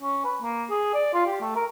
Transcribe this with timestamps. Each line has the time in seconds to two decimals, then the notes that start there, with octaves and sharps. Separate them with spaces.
0.03 C#4
0.25 B4
0.42 A#3
0.71 G#4
0.94 D5
1.14 F4
1.26 G4
1.41 A3
1.56 A#4